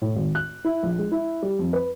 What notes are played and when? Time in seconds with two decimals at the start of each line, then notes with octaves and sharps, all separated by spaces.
0.02 A2
0.16 G#1
0.35 F#6
0.65 E4
0.83 A#1
0.99 G#3
1.12 E4
1.42 G3
1.59 F2
1.73 B4